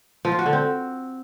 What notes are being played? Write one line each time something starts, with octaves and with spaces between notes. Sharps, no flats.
F3
F4
F#4
D3
C4